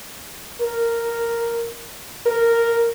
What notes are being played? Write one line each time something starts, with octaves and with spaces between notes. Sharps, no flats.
A#4
A#4